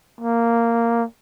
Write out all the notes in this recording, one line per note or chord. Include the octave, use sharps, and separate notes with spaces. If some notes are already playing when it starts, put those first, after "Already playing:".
A#3